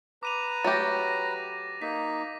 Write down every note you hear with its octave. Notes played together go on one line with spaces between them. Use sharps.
B4 A#5 D6 D#7 F7
F#3 A3 G4 A6 A#6
A#3 D#4 B6